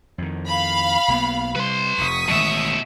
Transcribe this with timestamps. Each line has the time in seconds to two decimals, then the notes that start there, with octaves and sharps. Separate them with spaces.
0.18 F2 D#3
0.50 F5 B5
1.08 B1 A#3 B3
1.56 C3 G3 B4 C6
1.98 F1 F2 C#6 D#6 B6
2.29 A1 B2 D#3 G#3 E5